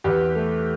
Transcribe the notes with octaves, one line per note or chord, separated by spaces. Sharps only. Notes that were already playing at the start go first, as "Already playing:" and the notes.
E2 G4 B4
A3